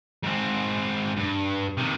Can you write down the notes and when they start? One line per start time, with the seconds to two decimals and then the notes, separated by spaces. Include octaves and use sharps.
0.24 G#2 C4
1.17 G2
1.78 C3 D#3